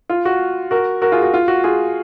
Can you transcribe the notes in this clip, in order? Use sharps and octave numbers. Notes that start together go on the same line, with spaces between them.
F4
F#4
F#4 A#4
F#4 A#4
F4 G#4
F#4
F4
F#4
F4 G#4